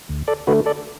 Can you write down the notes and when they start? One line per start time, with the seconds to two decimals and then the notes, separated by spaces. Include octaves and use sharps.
0.09 D2
0.28 A4 D5
0.47 D3 A3 F#4 B4
0.66 A4 D5